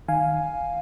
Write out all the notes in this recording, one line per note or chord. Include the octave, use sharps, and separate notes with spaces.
D#3 F5 G#5